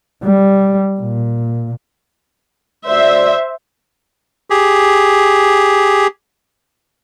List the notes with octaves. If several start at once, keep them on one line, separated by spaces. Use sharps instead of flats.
G3
A#2
D2 F#4 C5 D5 E5
G4 G#4